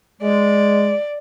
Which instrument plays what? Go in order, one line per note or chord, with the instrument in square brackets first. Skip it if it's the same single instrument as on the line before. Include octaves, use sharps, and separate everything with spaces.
[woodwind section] G#3 [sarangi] D5